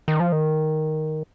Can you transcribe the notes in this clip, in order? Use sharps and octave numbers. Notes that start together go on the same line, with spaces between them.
D#3
F3
D#3